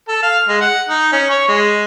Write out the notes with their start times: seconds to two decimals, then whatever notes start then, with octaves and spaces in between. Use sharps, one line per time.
0.08 A4
0.23 F5
0.48 G#3
0.61 F#5
0.89 D#4
1.12 C#4
1.30 C#5
1.48 G#3